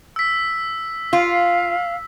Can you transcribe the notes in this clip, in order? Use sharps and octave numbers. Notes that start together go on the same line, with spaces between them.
E6 B6
F4 F5